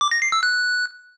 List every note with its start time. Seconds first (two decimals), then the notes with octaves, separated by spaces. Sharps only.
0.01 D6
0.11 A#6
0.22 C7
0.32 E6
0.43 F#6